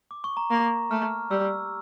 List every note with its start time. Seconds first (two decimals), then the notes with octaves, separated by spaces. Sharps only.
0.11 D6
0.24 C#6
0.37 A#5
0.51 A#3 A#5
0.91 A3 F6
1.31 G3 E6